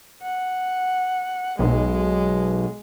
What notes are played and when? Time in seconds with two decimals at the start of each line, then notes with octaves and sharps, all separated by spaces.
0.22 F#5
1.59 B1 G#3